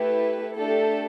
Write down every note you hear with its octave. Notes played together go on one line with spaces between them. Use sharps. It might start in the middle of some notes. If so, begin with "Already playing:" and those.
Already playing: A3 E4 G4 B4
A3 D4 G4 A4